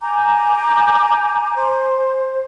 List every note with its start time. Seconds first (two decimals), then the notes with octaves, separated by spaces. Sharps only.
0.01 G#5 A#5 D6 G6
1.57 C5